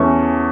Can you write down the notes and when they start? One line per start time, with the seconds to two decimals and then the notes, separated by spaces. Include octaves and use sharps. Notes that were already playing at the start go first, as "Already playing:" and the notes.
Already playing: E2 E3 A3 C#4 C#6